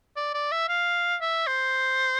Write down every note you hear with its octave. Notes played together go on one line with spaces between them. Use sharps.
D5
D5
E5
F5
E5
C5